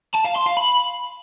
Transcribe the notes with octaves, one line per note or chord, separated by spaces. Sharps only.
A5
F5
C6
F5
B5